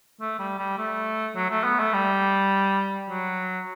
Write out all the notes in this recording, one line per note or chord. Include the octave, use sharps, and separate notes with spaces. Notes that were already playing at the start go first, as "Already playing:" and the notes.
A3
G3
G3
A3
F#3
A3
B3
A3
G3
F#3